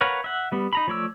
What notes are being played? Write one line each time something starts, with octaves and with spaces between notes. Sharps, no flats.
A#4 B4 C#5 F5 F#5
E5 F#5
G3 B3
D#4 A#5 B5
F3 A3 C#5 D5 E6